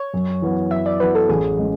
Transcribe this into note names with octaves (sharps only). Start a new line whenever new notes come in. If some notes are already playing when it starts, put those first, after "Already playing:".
Already playing: C#5
F#2
E3 B3 F#4
F#2 E5
D5
E3 B3 F#4 B4
A4
A1 G#4
G#3 C#4